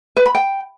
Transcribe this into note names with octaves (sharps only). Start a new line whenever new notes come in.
B4
B5
G5